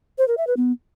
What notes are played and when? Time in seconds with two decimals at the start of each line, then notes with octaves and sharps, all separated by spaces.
0.18 C5
0.28 A#4
0.38 E5
0.47 B4
0.57 B3